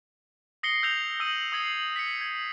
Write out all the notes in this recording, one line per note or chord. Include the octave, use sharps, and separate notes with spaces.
D#6 A#6 C7 C#7 G7
E6 G6 A#6 C7 F7 G7
D#6 E6 A#6 D#7 F#7 G7
D#6 G#6 C7 F7
B6 C#7
G#6